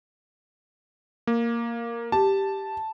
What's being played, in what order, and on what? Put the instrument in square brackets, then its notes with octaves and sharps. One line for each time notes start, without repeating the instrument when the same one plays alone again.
[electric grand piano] A#3
[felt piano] G4 [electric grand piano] A5